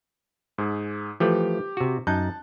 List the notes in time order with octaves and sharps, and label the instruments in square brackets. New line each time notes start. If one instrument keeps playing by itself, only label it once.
[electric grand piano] G#2 G#4
[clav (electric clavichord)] E3 F3 A3 [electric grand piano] G4
[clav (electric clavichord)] C3 F#4
[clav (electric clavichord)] F#2 D#4 [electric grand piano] A5 F#6 G6